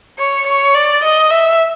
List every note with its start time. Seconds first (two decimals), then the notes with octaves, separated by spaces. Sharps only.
0.19 C#5
0.46 C#5
0.75 D5
1.03 D#5
1.31 E5